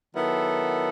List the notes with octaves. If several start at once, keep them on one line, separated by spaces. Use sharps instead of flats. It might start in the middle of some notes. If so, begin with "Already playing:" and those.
D#3 F#3 B3 E4 A4